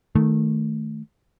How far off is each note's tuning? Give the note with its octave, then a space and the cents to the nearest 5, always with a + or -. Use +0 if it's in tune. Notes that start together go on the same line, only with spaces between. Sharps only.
D#3 +0 A3 -5